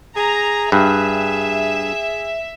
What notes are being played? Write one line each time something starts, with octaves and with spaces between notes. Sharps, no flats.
G#4 A#5
G2 G#4 E5